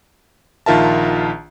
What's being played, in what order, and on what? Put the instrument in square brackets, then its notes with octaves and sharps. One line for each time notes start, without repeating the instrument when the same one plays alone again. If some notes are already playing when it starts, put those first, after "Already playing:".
[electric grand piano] A#1 D#3 F4 A#4 E5 A5